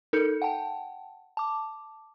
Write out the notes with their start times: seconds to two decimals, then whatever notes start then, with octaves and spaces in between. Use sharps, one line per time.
0.13 D#4 A4 A#4 G6 C#7
0.42 F#5 G5 A5
1.37 A5 D6